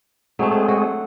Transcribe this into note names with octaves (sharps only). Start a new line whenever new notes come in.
F#3 G#3 A3 C4 G#4
D4 A4
F#4